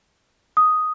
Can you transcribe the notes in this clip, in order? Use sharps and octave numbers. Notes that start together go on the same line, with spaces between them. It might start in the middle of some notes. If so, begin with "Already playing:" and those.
D#6